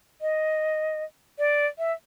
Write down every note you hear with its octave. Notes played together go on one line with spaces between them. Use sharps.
D#5
D5
E5